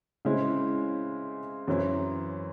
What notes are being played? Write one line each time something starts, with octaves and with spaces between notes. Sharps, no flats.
C#3 G#3 C4 E4
F#2 E3 C4 E4